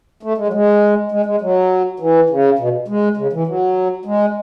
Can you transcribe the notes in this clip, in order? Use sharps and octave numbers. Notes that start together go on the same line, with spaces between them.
A3
G#3
F#3
G#3
G#3
G#3
F#3
E3
C#3
B2
G#3
C#3
E3
F#3
G#3